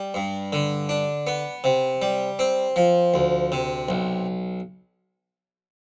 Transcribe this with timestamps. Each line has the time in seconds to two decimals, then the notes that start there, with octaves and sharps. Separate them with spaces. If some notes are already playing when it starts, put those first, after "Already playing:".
Already playing: G3
0.14 G2
0.53 D3
0.89 D4
1.27 B3
1.64 C3
2.02 G3
2.39 C4
2.76 F3
3.14 D2
3.52 C3
3.89 B1